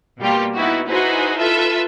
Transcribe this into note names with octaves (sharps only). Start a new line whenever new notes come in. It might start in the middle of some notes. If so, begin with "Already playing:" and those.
B2 G3 A#3 F4 G4
B3 D#4 E4 F#4
D#4 E4 F#4 G#4 B4 C5
F4 A4 B4 E5